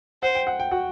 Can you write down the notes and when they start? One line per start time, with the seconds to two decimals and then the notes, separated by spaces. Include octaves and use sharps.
0.23 C5 F#5
0.35 G5
0.47 F#5
0.60 G5
0.71 F#4 F#5